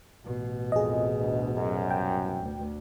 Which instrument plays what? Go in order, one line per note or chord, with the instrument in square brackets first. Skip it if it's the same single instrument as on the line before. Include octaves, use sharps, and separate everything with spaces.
[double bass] A1 B2
[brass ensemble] F2 [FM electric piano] G#4 D#5
[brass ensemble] D2
C2 F#2
[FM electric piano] G5
[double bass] D2